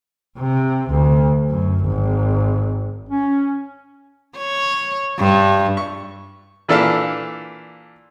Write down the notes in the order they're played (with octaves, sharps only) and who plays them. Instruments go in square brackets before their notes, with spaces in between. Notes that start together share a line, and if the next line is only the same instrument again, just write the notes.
[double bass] C3
D2
F#2
G#1
[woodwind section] C#4
[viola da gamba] C#5
G2
[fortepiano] C#6
A#2 E3 D4 A4 F5 E6